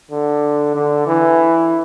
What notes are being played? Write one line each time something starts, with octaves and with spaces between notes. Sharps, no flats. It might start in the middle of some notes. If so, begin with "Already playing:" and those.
D3
D3
E3